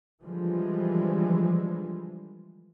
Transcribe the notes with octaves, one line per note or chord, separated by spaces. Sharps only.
D3 E3 F3 G3 G#3